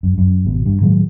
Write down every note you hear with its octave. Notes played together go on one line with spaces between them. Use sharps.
F#2
F#2
G#1 B2
G2
A2 D#3 F#3 G#3